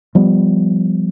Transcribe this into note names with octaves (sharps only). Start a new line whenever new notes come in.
F3 G3 B3